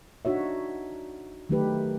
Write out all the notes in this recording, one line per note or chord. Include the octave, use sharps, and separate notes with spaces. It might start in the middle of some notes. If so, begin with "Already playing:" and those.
D4 D#4 F#4 C#5 E5
D#3 F#3 A3 D#4 G4 B4